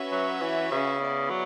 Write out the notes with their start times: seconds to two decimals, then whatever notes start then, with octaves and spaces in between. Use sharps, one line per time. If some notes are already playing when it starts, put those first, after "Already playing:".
Already playing: C#4 F#4 B4 E5
0.12 F#3
0.41 E3
0.71 C#3
1.01 B3 E4 B4 D5
1.30 F#3